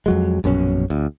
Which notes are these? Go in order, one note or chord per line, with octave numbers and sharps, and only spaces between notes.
F2 F#3 G#3
A#1 F#2 B2 C#4
D2